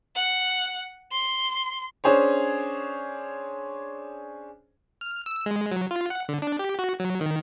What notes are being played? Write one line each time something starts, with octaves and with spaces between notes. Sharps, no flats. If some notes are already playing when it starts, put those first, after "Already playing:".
F#5
C6
C#4 D4 G#4 C5 C#5
F6
E6
G#3
F#3
F4
F#5
D3
D4
G4
F#4
F#3
D#3